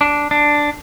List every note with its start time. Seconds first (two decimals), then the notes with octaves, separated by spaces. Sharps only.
0.01 D4
0.31 D4